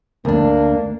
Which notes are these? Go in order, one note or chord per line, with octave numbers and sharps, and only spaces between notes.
D2 A#3 D4